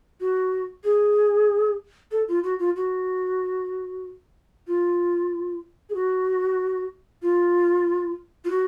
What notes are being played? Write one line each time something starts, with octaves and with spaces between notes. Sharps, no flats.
F#4
G#4
A4
F4
F#4
F4
F#4
F4
G#4
F#4
F4
F4
F#4